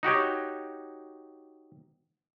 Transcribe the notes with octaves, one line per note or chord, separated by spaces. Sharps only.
D#4 F#4 G4 C#5